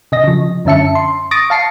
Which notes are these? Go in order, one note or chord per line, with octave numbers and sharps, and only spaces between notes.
C3 D#5 A#6
C#3 F3
F#2 D3 C#4 E5 A5 C#7
C6
C#6 D#6 A6 A#6 D7
F5 A5 C7 C#7